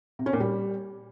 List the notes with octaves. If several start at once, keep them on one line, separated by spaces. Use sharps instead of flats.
C3
C#4
A#2
G3